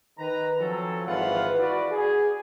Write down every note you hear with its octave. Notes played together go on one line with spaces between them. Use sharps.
D#3 B4 A#5
F3 F#3 C4 C#4 A4
G#1 E3 F4 B4 F5 F#5
E4 F#4 B4 D5
G#4